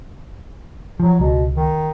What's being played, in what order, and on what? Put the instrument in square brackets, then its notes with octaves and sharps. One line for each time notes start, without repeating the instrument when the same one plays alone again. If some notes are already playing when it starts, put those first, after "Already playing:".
[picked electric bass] F3 [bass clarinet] F#3
[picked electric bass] C#2 [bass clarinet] B2
[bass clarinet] D#3